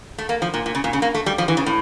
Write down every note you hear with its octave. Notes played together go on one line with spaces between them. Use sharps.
A3
A#3
F3
A#2
A#2
C#3
A#2
C#3
A#3
A3
G3
F3
E3
C#3
A2